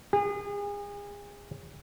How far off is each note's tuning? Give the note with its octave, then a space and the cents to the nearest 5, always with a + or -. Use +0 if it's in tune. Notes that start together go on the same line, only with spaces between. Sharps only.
G#4 -35